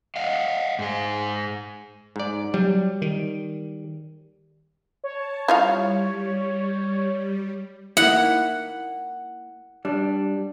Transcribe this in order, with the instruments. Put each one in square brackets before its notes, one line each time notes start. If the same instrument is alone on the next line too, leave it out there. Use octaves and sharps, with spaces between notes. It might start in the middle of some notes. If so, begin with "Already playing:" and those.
[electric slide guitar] D#5 F5 F#5
G#2 G#4
[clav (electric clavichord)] G#2 D5
[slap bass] F#3 [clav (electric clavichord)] G3
[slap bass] D#3
[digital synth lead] C#5 [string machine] A5
[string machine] G3 [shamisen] E4 F4 F5
[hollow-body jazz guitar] A#3 E4 [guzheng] F#5
[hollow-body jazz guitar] G3 D4